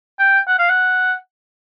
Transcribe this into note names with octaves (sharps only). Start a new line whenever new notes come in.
G5
F#5
F5
F#5